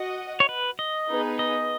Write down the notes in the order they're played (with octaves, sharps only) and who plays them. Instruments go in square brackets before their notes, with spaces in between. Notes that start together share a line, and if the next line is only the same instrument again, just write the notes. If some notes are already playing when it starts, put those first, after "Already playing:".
Already playing: [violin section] F#4 D#5 F#5
[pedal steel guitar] C#5
B4
D#5
[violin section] B3 D#4 G#4 B4
[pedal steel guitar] D#5